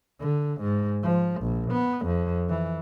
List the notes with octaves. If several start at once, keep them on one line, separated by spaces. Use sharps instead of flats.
D3
G#2
F3
A#1
B3
F2
E3